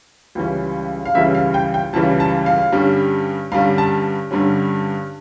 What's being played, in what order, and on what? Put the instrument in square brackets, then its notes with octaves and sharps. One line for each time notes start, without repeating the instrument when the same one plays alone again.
[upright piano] C#2 C#3 E3 G3 C#4
F5
C#2 C#3 E3 G3 C#4 E5
F5
G5
G5
C#2 C#3 E3 G3 C#4 A5
A5
F5
G2 D3 G3 C#4
G2 D3 G3 C#4 F5
A5
G2 D3 G3 C#4